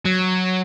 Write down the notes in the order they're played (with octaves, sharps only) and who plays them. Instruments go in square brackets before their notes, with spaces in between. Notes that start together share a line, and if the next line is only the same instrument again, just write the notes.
[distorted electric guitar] F#3